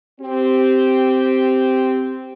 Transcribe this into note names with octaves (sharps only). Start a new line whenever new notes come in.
C4 G4